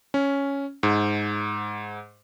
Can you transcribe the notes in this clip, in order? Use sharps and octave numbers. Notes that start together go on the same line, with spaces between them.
C#4
G#2